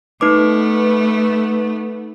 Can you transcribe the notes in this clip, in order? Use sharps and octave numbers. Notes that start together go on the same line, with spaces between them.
A3 B3 D#4 B4 D6